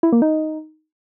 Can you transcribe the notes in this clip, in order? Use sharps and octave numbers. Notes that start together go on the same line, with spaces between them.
E4
A#3
D#4